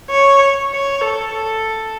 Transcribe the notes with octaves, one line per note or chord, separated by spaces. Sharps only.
C#5
C#5
A4
A4